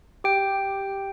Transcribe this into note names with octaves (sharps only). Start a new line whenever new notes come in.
G4 G5